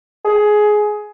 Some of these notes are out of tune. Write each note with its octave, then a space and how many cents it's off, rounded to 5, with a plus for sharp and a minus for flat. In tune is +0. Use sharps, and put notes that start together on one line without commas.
G#4 +15